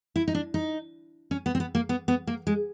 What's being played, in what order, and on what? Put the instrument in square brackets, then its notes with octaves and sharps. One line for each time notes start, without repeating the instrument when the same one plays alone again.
[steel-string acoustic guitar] E4
D#4
D4
D#4
C#4
B3
C4
B3
A#3
B3
B3
A#3
G#3